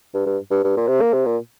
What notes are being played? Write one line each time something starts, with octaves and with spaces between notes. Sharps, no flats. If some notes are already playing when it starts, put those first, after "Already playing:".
G2
G2
G2
G2
A#2
C3
A#3
C3
A#2